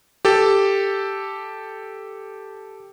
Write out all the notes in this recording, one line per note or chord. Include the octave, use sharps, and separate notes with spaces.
G4 A4